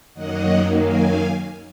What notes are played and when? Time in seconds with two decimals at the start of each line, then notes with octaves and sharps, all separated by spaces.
0.14 F#2 D#3 F#3 A#3 D#5 F#5
0.79 F5 G#5